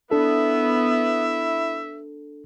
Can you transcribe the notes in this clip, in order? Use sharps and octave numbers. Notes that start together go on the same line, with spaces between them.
B3 D4 E4 A4 E5